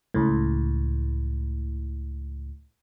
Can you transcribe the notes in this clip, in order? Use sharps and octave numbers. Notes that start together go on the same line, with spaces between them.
C#2 A2